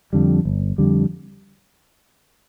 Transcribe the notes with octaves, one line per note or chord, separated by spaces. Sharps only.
F2 D3 G3
G1
F2 D3 G3